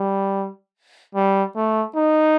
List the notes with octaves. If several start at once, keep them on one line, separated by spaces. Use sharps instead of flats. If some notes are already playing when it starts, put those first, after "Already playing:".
Already playing: G3
G3
A3
D#4